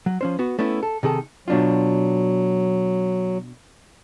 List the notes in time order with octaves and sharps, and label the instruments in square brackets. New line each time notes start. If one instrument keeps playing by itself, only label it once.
[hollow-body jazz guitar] F#3
F3 C#4 C5
B3 F#4
A3 B3 C#4 E4
A4
C3 D#3 G#4 A4
[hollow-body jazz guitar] B2 D4 F4 [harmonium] F#3